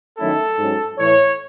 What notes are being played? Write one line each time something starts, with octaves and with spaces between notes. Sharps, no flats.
D#3 F#3 A3 C#4 E4 A4
G#2 F#3 C#4
A2 E3 A3 C#5